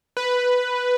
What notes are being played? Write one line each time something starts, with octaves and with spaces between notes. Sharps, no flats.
B4